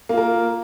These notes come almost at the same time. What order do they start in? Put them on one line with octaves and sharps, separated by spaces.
A#3 F4 A#4